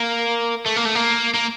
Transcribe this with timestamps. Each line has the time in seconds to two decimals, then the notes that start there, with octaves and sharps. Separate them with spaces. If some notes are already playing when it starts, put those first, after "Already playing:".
Already playing: A#3
0.66 A3
0.76 A#3
0.85 A3
0.95 A#3
1.34 A#3